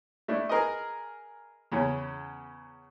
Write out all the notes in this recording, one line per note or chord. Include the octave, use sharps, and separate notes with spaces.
A3 D4 E4
G#4 A#4 B4 D#5
E2 C#3 C#4